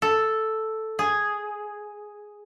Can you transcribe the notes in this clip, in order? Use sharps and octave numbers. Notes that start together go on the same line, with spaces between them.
A4
G#4